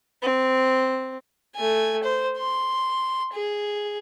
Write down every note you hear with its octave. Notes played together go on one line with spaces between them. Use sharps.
C4
A3 G#5
C5
C6
G#4